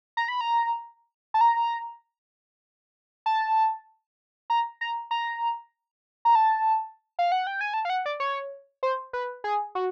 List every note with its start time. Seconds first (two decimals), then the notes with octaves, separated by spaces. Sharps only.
0.17 A#5
0.28 B5
0.41 A#5
1.34 A5
1.41 A#5
3.26 A5
4.50 A#5
4.81 A#5
5.11 A#5
6.25 A#5
6.35 A5
7.19 F5
7.32 F#5
7.47 G5
7.61 G#5
7.74 A5
7.85 F5
7.90 F#5
8.06 D5
8.20 C#5
8.83 C5
9.13 B4
9.44 G#4
9.75 F#4